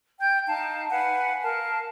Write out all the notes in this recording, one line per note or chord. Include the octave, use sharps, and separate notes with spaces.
G5 G6
D#4 F5 A5
B4 F5 F#5 G#5
A#4 F5 A5